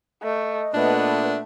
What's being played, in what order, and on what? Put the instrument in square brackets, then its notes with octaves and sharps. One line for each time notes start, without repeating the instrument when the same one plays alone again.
[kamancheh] A3 [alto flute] D#5
[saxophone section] A#2 A3 [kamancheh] B3 B4 [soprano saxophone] D4